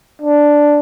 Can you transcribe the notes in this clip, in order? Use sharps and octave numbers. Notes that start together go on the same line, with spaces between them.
D4